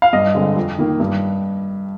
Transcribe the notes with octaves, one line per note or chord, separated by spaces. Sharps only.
F5
G2 D#5
D3 G#3 C4
F2
D#3 A#3
G2